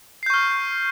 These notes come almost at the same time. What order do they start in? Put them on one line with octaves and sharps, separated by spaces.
C7 G6 C#6 F6